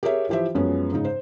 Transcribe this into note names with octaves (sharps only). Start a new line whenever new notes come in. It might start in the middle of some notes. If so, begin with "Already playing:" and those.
G4 G#4 A#4 C#5 E5
E3 F3 G4 C5 E5
F#2 F3 G#3 B3 C#4
G#2 C#3 D#4
C5